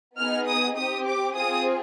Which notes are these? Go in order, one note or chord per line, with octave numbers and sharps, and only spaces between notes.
B3 D#4 G#4 F6
D#6
C4 G4 D#6
D6
C4 F4 G#4 D#6